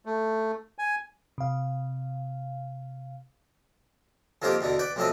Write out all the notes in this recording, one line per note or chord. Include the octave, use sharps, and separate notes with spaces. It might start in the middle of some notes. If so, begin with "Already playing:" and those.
A3
G#5
C3 F5
F2 D#3 F3 A#3 G4
E2 B2 D3
B4 D5 G5
B1 F2 A2 F3 C4 D#5